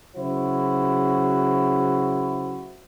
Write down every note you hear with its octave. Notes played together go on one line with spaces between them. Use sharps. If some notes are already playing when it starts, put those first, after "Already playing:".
C#3 F#3 E4 F#4 C5